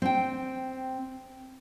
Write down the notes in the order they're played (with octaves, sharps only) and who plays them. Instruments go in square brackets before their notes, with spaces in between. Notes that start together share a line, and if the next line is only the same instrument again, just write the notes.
[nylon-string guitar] C4 G5